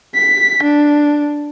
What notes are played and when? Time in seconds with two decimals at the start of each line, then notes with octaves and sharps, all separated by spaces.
0.15 B6
0.63 D4